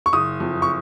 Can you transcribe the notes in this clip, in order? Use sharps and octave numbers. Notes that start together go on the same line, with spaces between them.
C#6
F#1 D#6
F2
C#6